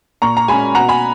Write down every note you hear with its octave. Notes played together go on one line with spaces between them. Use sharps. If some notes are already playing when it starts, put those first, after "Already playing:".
A#2 A#5 C#6
A#5
G#3 C#4 G#5 B5
B2 F#5 A#5
G#5 B5